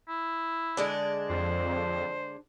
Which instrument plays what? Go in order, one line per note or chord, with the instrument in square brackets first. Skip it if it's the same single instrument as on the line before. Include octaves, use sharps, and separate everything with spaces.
[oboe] E4
[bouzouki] D3 G#3 D4
[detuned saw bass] F2 [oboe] C5